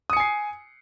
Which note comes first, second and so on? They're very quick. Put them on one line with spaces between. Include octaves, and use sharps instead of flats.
D#6 C#7 G#5 C7